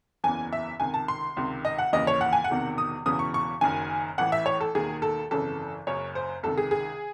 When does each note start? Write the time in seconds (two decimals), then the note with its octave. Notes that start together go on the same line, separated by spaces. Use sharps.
0.24 F#1 E2 C#3 E3 G#5
0.53 E5
0.80 C#2 C3 D#3 G#5
0.94 A5
1.08 C6
1.37 C#2 C3 D#3
1.65 D#5
1.78 F#5
1.93 D#2 C#3 E3 D#5
2.07 C#5
2.21 F#5
2.33 G#5
2.44 F#5
2.50 E1 E2 C3 D#3
2.78 D#6
3.06 E1 E2 C#3 E3 D#6
3.19 C#6
3.34 C#6
3.61 F#1 F#2 D#3 G#5
4.18 A1 A2 E3 F#5
4.32 E5
4.46 C#5
4.60 A4
4.75 E1 D#2 D#3 G#4
5.02 A4
5.31 G#1 F#2 C#3 E3 A4
5.87 F#1 F#2 C#3 C#5
6.15 C5
6.43 C#2 C3 D#3 A4
6.57 G#4
6.71 G#4